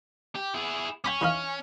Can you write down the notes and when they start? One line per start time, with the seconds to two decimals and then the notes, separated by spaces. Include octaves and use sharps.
0.35 G4
0.54 E4 G#4
1.04 C#4 G5 B5 D6
1.21 E3 D#4 F5